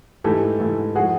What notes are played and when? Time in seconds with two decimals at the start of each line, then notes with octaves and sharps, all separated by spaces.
0.24 G#2 E3 A3 G4 A4
0.60 G#2 E3 A3
0.95 F3 G#3 F#4 G#4